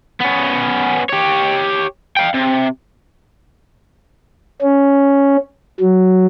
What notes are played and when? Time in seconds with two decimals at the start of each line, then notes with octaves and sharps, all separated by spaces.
0.21 B3 C#4
1.09 G4 C#5
2.17 F5 G5
2.34 C3
4.62 C#4
5.80 F#3